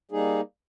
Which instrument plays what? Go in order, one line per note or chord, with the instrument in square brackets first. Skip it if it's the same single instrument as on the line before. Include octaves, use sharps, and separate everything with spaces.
[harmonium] G3 A#3 D#4 G#4